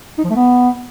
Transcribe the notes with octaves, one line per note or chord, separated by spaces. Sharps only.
D#4
F3
A3
B3